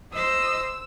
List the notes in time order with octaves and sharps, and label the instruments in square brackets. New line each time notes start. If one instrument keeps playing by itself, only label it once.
[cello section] C5 [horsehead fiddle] D#5 [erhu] E6